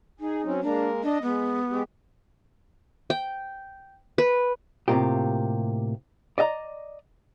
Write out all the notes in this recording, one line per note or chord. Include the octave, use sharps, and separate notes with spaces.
D#4 G#4
F#3 C4 C#4
G#3 A#3 D4 A#4
D4 D#5
G#3 B3
G#3 G4
G5
B4
A2 C3 D#3 A#3 F4 G4
D5 D#5 F5 A#5